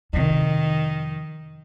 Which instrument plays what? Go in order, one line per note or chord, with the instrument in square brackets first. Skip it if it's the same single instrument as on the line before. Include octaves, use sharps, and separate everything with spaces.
[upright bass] F2 C3 [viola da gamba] D#3